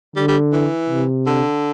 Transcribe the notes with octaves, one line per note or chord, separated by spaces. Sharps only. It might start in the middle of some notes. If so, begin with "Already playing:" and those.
D3 G3
G3
E3
C3
D3